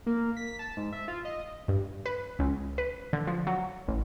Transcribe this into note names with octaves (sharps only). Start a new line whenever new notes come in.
A#3
B6
A5
G#2
E5
F4
D#5
G2
B4
C#2
B4
D3
F3
F#3
A1